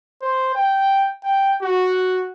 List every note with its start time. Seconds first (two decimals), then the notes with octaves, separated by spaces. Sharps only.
0.22 C5
0.55 G5
1.24 G5
1.62 F#4